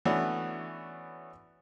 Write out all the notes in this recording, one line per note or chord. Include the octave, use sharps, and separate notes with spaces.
E3 A3 B3 C#4 D4 F#4